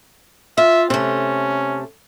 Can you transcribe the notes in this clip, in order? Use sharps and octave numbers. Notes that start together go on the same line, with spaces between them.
F4 E5
C3 A3 C#4